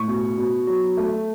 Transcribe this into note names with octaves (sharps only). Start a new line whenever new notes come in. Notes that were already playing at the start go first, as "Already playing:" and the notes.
Already playing: A2 C#6
B2
B2
F#3
A3